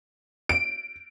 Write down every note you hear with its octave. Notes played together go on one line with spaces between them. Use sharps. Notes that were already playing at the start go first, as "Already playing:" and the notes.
D7